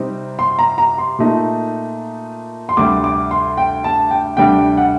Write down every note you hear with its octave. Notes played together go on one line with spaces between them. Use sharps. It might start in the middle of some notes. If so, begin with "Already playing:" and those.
Already playing: C3 G3 C4 D#4
C6
A#5
A#5
C6
A#2 A3 D#4
C6
D2 C3 G3 D6
D6
C6
G5
A5
G5
D2 C3 G3 D4 G5
F#5